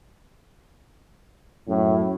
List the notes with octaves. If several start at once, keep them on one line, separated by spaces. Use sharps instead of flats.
F#2 A2